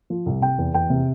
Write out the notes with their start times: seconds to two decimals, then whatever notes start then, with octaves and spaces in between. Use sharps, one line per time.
0.10 F3
0.26 C2
0.41 C3 G5
0.58 E2
0.74 E2 G5
0.90 C3